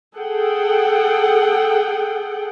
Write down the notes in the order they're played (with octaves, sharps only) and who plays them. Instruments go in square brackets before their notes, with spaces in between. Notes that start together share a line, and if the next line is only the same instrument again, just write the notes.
[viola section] G#4 A4 F#5 G5